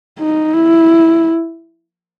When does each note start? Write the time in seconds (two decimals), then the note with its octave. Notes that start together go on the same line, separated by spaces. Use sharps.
0.19 D#4
0.54 E4